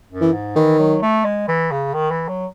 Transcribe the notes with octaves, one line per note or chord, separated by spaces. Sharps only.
F#2
E3
G#2
D#3 E3
F#3
A3
G#3
E3
C#3
D#3
E3
F#3